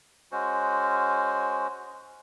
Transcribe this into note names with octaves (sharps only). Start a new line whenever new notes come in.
G#3 C#4 F#4 C5